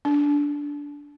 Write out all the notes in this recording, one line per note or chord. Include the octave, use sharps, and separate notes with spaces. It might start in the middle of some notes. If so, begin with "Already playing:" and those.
D4